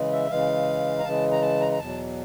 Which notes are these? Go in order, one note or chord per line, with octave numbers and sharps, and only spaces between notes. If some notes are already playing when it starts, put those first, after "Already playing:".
Already playing: C#3 E3 G#3
E5
C#3 E3 G#3 F5
A#5
C#3 E3 G#3 A5
A#5
A5
A#5
A#5
E2 B2 F#3 A5